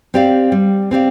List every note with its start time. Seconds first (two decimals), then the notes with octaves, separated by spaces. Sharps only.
0.14 C4 G4 D5 F5
0.52 G3
0.91 C4 G4 D5 F5